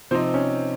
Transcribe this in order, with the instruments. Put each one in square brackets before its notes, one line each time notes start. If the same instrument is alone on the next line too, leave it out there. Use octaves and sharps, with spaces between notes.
[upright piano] C3 F3 C4 D#4 [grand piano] C5
[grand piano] C#4